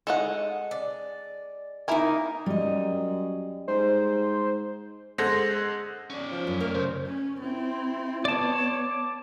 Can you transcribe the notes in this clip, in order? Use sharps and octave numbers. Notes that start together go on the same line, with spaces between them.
G#3 D#4 A4 F#5
D5
A#3 D#4 E4 A#4 G#5
F#2 G3 D#5
G#2 C5
D3 G#3 A4 C5 A#6
C#4 D5
F3
F#2
A3 A#3 A#4
C#3 C5
C#4
C4 E4
B3 C#5 D5 A5